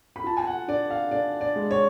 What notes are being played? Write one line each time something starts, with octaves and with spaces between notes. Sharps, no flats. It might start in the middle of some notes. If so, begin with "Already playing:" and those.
B5
F4 A5
G#5
F#5
D4 D5
F5
D4 D5
D5
G#3
C#5